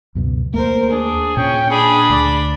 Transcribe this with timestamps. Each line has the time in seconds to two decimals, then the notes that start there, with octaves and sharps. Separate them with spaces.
0.15 C#2 F#2 B2
0.54 D#2 A3 A#3 A#4 C5
0.90 D4 G#4
1.37 A#2 C#4 G5
1.71 D4 G#4 B5
2.10 D2 D5